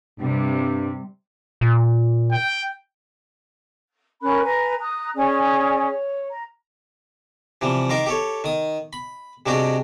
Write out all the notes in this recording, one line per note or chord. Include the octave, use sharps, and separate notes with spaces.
G2 C3 G3
A#2
G5
C#4 A#4 B5 F#6
B4 G#5 A#5
A#5 D#6 F#6
C#4 G#4 D5 G#5
C#5
A#5
C3 E3 F3 G3
D#3 A#4 F5 D6
G4 A4 C#5
D#3 D#6
B5
C3 G3 G#3 D4 F#4 G4